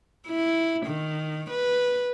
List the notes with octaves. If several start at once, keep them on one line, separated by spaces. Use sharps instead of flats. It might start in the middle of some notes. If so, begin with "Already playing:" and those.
E4
D#3
B4